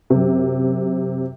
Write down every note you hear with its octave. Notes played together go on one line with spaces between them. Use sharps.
F#2 C3